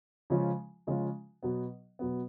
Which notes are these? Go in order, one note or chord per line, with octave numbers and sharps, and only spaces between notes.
C#3 F3 G#3 C#4 F4
C#3 F3 G#3 C#4 F4
B2 F#3 B3
B2 F#3 B3